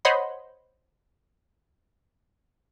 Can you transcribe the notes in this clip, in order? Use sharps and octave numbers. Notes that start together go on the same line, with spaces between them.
C5 C#5 D#5 F#5 B5 C6